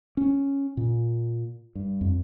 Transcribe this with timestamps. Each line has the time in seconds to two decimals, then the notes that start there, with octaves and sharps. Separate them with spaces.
0.17 C#4
0.77 A#2
1.75 G2
2.01 F2